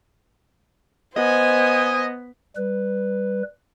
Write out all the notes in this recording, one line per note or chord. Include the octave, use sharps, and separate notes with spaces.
B3 C5 D#5 G#5
G3 B4